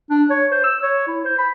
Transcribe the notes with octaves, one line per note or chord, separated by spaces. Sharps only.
D4
C#5
C5
E6
C#5
E4
C5
B5